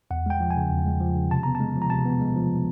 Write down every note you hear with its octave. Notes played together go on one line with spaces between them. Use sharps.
E2 F#5
G#3 G5
F3
G#5
C#3
E2
G#3
F3
C#3
C3 A5
B3 A#5
A5
G#3
F3
A#5
C3 A5
B3
G#3
F3